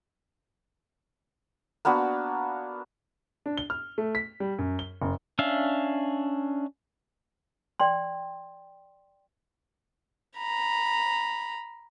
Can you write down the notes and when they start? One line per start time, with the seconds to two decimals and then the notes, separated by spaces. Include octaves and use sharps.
1.85 A#3 B3 D4 F#4
3.46 D4
3.57 G7
3.70 F6
3.98 A3
4.15 B6
4.40 G3
4.59 F#2
4.79 G7
5.02 F#1
5.39 C#4 D4 E5 F5
7.80 D5 G5 C6
10.37 A#5 B5